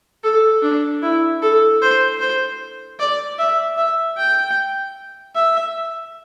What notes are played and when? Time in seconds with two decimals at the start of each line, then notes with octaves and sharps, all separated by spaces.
0.24 A4
0.62 D4
1.02 E4
1.42 A4
1.81 C5
2.20 C5
2.99 D5
3.38 E5
3.77 E5
4.17 G5
5.35 E5